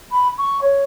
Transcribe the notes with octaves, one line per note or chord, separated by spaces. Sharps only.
B5
C#6
C#5